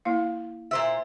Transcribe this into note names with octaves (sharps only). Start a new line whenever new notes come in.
A#3 E4 F5
A#2 C5 E5